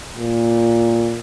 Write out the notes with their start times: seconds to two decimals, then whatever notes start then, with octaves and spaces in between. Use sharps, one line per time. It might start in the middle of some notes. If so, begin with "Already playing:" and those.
0.18 A#2